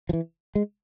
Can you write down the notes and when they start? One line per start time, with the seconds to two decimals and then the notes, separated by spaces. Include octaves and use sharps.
0.09 F3
0.13 E3
0.55 G#3